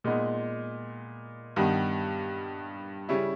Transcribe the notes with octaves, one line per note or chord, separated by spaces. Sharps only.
A#2 G#3 B3 D#4
G2 D#3 G3 B3
C#3 G3 C#4 E4